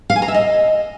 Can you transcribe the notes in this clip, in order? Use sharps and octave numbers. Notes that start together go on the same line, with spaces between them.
F5
G#5
A#5
E5
D#5